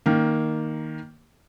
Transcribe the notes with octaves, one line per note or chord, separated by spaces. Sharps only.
D#3 A#3